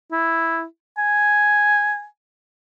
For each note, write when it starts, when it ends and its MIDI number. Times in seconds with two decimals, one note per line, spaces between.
0.12 0.64 64
0.98 2.05 80